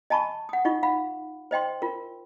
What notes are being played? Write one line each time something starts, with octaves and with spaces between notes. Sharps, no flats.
D#5 G#5 A5 B5 C#6
F#5 D#6
D#4 F4 D#5 C#6
F5 F#5 B5
C5 D#5 G5 C6
F4 A#4